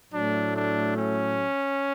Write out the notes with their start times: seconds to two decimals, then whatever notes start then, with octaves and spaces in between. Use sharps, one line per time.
0.11 A2 F#3 A3 D4
0.54 D4
0.95 C#4